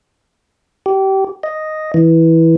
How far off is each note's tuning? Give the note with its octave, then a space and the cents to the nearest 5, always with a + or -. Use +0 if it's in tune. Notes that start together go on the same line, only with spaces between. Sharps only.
G4 -25
D#5 +0
E3 -10